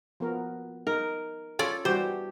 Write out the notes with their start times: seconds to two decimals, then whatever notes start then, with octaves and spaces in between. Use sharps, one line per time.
0.20 F3 B3 A#4
0.87 D#4 A#4
1.59 C#4 F4 A4 D5
1.85 E3 G3 F#4 G4 C5